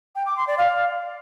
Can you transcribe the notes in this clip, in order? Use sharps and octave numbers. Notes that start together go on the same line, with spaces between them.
G5
D6
C6
D5
F5